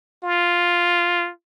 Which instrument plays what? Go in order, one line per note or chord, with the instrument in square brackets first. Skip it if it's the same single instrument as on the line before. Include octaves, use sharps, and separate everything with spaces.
[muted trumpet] F4